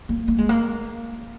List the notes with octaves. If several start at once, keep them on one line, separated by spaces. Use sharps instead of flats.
A#3
A#3
G#3
A#3